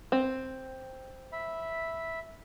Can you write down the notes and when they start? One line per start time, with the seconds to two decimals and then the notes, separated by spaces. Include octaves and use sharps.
0.12 C4
1.32 E5 B5